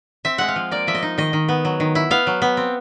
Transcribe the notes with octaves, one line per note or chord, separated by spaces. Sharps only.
C4 E5
G#3 F#5
F5
F3
A#3 D5
F3 E5
D#5
D#4
D#3 D#5
D#3
B3
F#3
D#3
E4
B3 F5
F#3
B3
C4